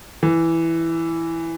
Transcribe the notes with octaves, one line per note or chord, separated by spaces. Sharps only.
E3